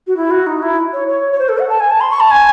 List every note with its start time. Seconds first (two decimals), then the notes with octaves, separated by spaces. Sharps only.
0.07 F#4
0.17 E4
0.31 F#4
0.47 D#4
0.62 E4
0.93 C#5
1.08 C#5
1.32 C#5
1.39 C5
1.49 A4
1.59 F#5
1.69 A5
1.80 G#5
1.91 A5
2.00 C6
2.11 C#6
2.20 A5
2.31 G#5